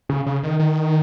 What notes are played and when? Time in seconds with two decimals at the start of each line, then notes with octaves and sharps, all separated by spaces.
0.09 C#3
0.26 C#3
0.43 D#3
0.59 D#3